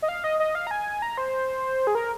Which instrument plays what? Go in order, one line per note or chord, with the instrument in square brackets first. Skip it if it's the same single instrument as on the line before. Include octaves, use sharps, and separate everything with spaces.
[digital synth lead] D#5
F5
D#5
D#5
F5
A#5
G#5
A#5
C5
G#4
A#4